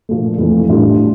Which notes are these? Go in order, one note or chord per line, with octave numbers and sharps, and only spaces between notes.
A#2 F3 A3
F2 E3 A3
A2 G3 D4 F4